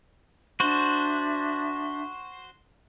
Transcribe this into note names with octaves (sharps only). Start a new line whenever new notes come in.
D4 F#4 C5 E5